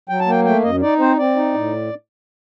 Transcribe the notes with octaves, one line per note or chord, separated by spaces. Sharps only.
F#3 G5
A5
A#3 G5
A3 G5
F#2 D#5
D#4 D5
C4 C5
C4 D5
D#4
A2